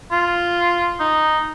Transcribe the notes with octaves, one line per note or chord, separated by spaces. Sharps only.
F4
D#4